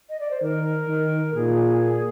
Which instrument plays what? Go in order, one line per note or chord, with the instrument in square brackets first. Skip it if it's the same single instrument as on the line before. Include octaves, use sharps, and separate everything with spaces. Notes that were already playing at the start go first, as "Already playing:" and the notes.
[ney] D#5
D5
C5
[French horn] D#3 [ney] A#4
[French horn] D#3
[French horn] A#2 [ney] G#4